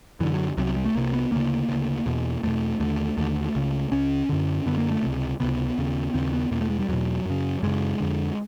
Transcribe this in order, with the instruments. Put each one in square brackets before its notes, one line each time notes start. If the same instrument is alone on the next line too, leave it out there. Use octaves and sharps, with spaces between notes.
[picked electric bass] F#2 D3 E3
F#3
C2 C3 F#3
G3
A3
C2 C3 A#3
B3
D2 C#3 A#3
D2 C#3
E2 B2
E2 B2 A3
D#2 D3 A3
D#2 D3 A3
C#2 C#3
C#2 C#3 C#4
F#2 D3
F#2 D3 B3
A#3
A3
C#2 C3
C#2 C3 B3
D#2 C#3
D#2 C#3 C4
B3
E2 B2 A#3
A3
G#3
G3
E2 B2 F#3
F#2 C#3
F#2 C#3 G#3
F2 D3